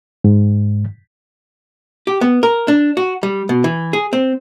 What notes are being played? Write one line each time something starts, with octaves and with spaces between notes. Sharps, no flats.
G#2
G4
B3
A#4
D4
F#4
G3
B2
E3
G#4
C4